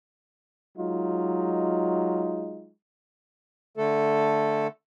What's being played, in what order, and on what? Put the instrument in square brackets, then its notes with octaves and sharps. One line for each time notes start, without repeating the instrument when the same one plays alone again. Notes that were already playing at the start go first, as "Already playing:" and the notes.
[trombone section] F#3 G#3 D#4 F4
[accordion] D3 A3 A4